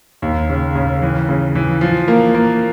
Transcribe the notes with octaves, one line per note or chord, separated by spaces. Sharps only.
D#2
C#3
C#3
E3
C#3
E3
F3
A#3
A#3